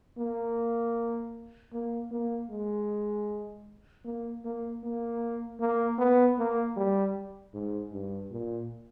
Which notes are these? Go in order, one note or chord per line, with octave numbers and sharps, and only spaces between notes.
A#3
A#3
A#3
G#3
A#3
A#3
A#3
A#3
B3
A#3
G3
G#2
G2
A#2